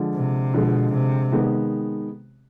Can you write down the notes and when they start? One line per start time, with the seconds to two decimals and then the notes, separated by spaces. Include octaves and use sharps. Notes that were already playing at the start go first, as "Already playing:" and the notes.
Already playing: D3 F3 G#3
0.14 C3
0.53 B2 D3 F3 G#3
0.93 C3
1.32 D#3 G#3 B3